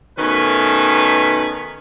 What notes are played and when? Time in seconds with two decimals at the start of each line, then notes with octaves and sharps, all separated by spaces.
0.18 B2 D#3 A3 C#4 B4